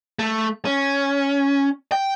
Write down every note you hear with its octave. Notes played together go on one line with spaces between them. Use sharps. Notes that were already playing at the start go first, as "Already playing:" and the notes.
A3
C#4
G5